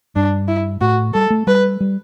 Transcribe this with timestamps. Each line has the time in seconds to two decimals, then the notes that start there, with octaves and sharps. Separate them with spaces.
0.16 G2 D4
0.48 E4
0.81 A2 F#4
1.14 G3 A4
1.30 A3
1.47 G3 B4
1.81 G3